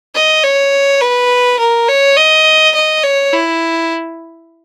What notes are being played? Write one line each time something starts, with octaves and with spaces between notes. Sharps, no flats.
D#5
C#5
B4
A#4
C#5
D#5
D#5
C#5
E4